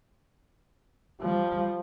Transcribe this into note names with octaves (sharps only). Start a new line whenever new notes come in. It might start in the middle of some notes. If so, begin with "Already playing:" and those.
F3 G3